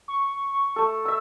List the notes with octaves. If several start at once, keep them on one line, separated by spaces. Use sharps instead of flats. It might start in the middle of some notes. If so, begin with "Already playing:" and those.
C#6
A3 A4
E5 E6